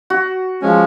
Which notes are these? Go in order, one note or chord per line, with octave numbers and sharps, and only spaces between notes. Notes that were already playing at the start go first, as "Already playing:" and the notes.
F#4
F3 G#3 C#4